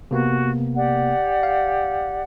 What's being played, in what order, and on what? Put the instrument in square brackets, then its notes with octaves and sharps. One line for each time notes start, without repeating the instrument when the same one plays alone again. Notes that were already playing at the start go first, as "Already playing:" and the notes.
[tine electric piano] C3 A#3 B3 [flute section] F#4
[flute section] G4 D5 F#5
[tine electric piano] F5